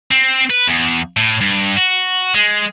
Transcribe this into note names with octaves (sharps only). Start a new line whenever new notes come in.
C4
B4
E2
A2
G2
F#4
G#3